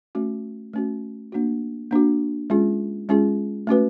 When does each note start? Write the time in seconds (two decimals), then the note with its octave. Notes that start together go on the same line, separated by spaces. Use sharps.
0.15 A3 C#4 F#4
0.73 A3 C#4 F#4
1.32 A#3 D4 F#4
1.91 A#3 D4 F#4
2.50 G#3 C#4 F4 G#4
3.09 G#3 C#4 F4 G#4
3.67 A3 C#4 F#4 B4